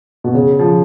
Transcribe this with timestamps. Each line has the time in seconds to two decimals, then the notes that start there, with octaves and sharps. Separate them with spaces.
0.24 B2
0.34 C#3
0.59 F3